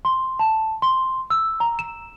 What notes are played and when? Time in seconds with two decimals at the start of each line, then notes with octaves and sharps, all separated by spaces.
0.05 C6
0.39 A5
0.82 C6
1.30 E6
1.60 A#5
1.79 E7